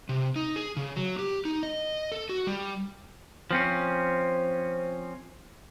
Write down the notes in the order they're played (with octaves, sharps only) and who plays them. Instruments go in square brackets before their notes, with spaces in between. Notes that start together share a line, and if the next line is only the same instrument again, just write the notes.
[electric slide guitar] C3
D#4
G#4
C#3
F#3
G4
D#4
D#5
A4
F#4
G3
[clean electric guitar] F3 C4 C#4